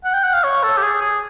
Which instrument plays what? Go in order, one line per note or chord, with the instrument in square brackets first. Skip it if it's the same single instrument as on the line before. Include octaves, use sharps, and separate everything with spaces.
[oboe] F#5
G5
F#5
F5
C#5
A4
G4
G#4
G#4